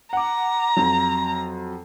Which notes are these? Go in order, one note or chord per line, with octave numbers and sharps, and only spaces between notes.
F#5 A#5 D6
F2 F#3